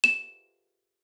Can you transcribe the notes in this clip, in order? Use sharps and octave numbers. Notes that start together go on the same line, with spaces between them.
E7